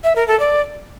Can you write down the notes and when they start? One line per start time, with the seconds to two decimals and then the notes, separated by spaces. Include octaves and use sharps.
0.04 E5
0.16 A#4
0.28 A4
0.40 D5